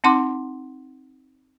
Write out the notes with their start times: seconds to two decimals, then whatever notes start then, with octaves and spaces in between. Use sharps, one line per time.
0.04 C4 D#4 F#5 C6 D6